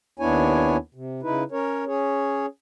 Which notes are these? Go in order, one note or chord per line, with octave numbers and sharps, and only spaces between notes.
D#2 B3 D4 E4 C#5 G#5
C3
C#3 D#4 E4 B4
C#4 A#4 C#5
C#4 G#4 C#5